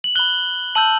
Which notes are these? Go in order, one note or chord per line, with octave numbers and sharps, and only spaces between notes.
F#7
B5 F#6 G7
A5 E6 G6 F#7